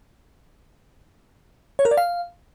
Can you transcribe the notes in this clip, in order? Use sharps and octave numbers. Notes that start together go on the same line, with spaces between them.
C#5
A#4
D5
F5